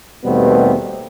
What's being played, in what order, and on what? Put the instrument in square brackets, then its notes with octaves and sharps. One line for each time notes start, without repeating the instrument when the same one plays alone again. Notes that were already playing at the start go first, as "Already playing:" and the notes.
[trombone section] D#2 B2 G3 A3 B3 C4